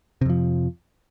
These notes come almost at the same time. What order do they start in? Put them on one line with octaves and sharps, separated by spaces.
C3 F2 F3